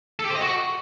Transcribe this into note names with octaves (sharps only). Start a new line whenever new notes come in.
A4
G4
C5
D#5
F#4